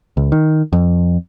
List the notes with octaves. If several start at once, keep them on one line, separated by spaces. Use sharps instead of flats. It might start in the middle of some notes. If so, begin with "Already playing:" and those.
C#2
D#3
F2